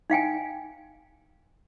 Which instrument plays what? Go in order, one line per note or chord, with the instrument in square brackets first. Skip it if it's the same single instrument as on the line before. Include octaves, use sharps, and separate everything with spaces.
[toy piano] D#4 F5 G5 G#5